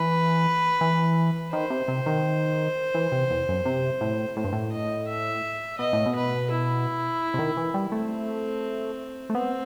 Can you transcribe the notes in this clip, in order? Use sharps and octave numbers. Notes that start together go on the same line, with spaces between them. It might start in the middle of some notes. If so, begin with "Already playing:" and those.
Already playing: E3 B4
E3
D#3 C5
C3
C3
D#3
E3
C3
E2
F#2
C3
A2
A2 C5
G2
A2
D#5
E5
B2 D#5
A2
B2
B4
E4
C3
D#3
E3
G3
A3 C4
A3
B3 C4